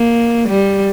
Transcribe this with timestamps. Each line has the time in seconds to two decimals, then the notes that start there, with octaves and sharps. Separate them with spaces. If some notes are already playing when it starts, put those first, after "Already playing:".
Already playing: A#3
0.48 G3